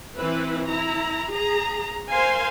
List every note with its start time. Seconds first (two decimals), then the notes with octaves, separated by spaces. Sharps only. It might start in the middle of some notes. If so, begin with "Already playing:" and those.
0.17 E3 C4 E4 B4
0.67 E4 A#5
1.32 G#4 A#5
2.10 A#4 C5 F5 G#5 C6